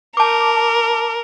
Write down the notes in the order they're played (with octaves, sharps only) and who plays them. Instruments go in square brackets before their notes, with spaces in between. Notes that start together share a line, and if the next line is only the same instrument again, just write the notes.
[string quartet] A#4 [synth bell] A5 D6